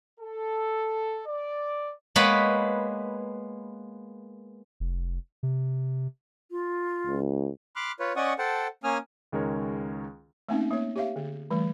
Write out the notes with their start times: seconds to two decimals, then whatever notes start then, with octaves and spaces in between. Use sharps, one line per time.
0.20 A4
1.27 D5
2.16 G#3 A#3 B3 B4 C#5 B5
4.80 F1
5.43 C3
6.51 F4
7.07 C#2
7.76 B5 C6 D6 F6 F#6
8.00 F4 B4 C#5
8.16 C#4 D5 D#5 F#5 C#6 D#6
8.39 A4 C5 F#5 G5 A5
8.84 A#3 C#4 G#5 D#6 F6
9.32 C#2 D#3 G#3 C#4 A#4 C#5
10.49 A3 A#3 C4 C#4 D#4
10.71 A#3 C#5
10.96 G4 C#5 E5 F5
11.16 D3
11.51 E3 G3 A3